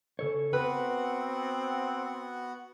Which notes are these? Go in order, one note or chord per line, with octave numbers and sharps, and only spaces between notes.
C#3 A4 C#5
B3 C4 F#4 B4 F#5 B5